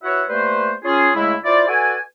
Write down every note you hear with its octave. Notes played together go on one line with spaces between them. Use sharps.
E4 F#4 B4 C#5 E5 F#5
G3 A3 A#3 B4 C5
C#4 F4 G#4
C#3 G#3 A3 E4
E4 F4 C5 D5
F#4 A4 B4 D5 G#5